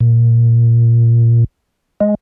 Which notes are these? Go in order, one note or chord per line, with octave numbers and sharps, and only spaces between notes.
A#2
G#3